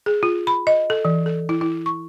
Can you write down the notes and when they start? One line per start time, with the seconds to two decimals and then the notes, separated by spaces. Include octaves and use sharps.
0.06 G#4
0.23 F4
0.47 B5
0.67 D#5
0.90 A4
1.05 E3
1.26 A4
1.49 E4
1.61 E4
1.86 C#6